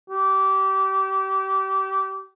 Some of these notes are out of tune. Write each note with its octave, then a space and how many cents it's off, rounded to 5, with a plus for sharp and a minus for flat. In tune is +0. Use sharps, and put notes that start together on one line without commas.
G4 -25